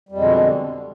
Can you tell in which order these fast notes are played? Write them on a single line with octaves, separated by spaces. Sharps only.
G3 F2 G#3 B2 D3